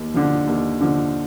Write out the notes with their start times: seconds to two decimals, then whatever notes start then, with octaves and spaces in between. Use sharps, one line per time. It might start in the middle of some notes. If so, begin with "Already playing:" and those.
Already playing: D#2
0.14 D3 F3
0.47 D#2
0.81 D3 F3